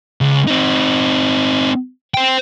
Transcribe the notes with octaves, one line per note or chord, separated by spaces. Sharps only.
C#2
C4 D#4
C5 G5